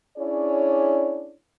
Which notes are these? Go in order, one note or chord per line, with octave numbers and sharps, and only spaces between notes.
C#4 D4 E4 G#4 C#5 D5